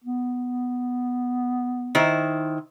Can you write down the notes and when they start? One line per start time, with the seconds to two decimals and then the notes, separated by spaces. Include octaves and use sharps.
0.04 B3
1.95 D#3 E4 C5